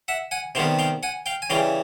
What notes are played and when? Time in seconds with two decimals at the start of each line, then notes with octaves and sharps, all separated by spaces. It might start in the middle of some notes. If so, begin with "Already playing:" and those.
0.08 E5 F#5
0.31 F#5 G#5
0.55 C3 D#3 G3 B3 F5 G5
0.79 F5 G5
1.03 F#5 G#5
1.26 F5 G5
1.42 G#5
1.50 C#3 E3 G3 F5 G5